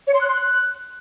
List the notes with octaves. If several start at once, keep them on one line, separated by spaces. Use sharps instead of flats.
C#5
C6
F#6
C6
F#6